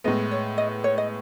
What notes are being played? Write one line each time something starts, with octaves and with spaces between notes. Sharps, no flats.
A2 G#3 B3 D#5
C#5
D#5
C#5
D#5